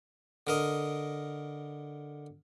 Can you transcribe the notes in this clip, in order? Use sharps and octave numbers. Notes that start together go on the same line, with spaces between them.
D3 A#4 D#5